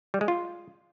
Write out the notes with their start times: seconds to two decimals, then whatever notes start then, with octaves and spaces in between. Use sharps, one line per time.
0.14 G3
0.21 G#3
0.28 F4